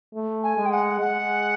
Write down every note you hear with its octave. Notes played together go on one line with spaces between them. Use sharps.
A3
G#5
G#3
G5
F#5
G#3 F#5